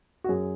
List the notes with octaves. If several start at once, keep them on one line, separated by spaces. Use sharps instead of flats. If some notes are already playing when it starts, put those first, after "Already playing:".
F#4
F#2 G#4